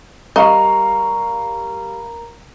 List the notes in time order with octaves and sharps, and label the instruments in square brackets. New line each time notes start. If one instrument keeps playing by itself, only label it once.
[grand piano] G3 F5 C#6 [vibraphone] A#4 [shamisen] D#5 [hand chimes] A#5